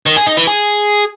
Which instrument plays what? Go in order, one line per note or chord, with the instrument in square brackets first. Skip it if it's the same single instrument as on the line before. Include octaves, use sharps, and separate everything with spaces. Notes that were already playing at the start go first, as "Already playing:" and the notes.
[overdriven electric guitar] D#3
G#4
D#4
E3
G#4